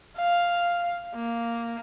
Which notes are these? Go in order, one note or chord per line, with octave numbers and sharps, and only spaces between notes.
F5
A#3